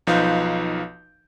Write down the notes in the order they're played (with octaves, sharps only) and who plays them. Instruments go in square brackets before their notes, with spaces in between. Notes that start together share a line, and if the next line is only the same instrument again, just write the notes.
[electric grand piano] B1 F3 D#4 B4 F5 G6